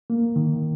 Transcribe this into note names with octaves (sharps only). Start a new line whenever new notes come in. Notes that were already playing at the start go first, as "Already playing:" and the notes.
A#3
D#3